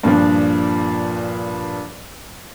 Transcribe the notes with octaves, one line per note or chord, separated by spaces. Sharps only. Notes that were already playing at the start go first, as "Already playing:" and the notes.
G2 A#2 F3 D4